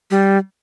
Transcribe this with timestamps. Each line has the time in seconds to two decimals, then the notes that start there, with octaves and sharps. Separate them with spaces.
0.11 G3